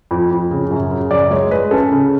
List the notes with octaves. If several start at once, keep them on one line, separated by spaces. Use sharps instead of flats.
F2
F2
C#3
F#2
C#3
F#2 D5
G#3 C#5
G#3 B4
C#4 A4
C#3